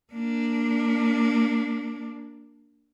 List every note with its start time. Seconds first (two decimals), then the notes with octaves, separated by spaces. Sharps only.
0.13 A#3 D4